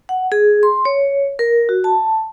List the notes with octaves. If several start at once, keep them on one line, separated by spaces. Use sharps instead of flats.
F#5
G#4
C6
C#5
A#4
F#4
A5